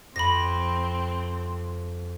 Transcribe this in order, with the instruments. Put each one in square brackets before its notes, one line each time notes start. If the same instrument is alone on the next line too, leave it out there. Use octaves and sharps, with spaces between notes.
[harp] F2 [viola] C4 [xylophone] B5 A#6